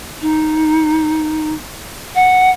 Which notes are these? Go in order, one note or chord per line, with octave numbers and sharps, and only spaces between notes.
D#4
F#5